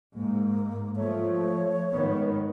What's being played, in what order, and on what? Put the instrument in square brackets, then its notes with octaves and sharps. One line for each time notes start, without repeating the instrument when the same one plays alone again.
[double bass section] G#2 [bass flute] A#3
[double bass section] F3 A3 [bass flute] C#5
[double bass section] G#2 D#3 B3